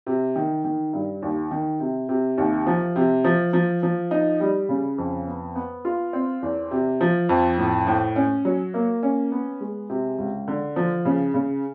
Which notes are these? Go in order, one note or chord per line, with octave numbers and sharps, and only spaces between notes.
C3
D#3
D#3
G2
D#2
D#3
C3
C3
D#2
F3
C3
F3
F3
F3
D#4
G3
C#3
F2
B3
B3
F4
C4
E2
C3
F3
F2
A2
A2
C#4
F#3
A#3
C#4
B3
G#3
C3
C#2
D3
F3
C#3
C#3